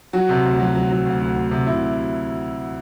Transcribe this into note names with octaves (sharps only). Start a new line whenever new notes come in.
F#3 F#4
C3
D2
F#3
F#3
F#3
D2
D2
D2
C3
C3 E4